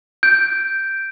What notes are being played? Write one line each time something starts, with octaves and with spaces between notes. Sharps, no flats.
G6 D7